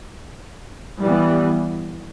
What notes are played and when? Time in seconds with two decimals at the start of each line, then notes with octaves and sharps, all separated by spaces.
0.99 E3 G3 B3